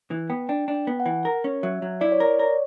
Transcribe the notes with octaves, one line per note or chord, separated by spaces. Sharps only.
E3
B3 G5
D4 G5
D4
G5
B3
F#5
E3
A#4
C#4
F#3 E5
F#3
E4 D5
C#5
A#4 D5
A#4 C#5